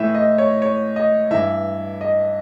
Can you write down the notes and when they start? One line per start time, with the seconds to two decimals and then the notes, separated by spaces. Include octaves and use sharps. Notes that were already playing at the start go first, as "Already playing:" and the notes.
Already playing: A2 E3 E5
0.14 D#5
0.38 C#5
0.62 C#5
0.96 D#5
1.31 G2 E3 E5
2.01 D#5